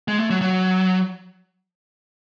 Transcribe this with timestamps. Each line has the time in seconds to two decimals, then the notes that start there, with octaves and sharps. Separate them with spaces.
0.08 G#3
0.19 A3
0.31 F#3
0.42 F#3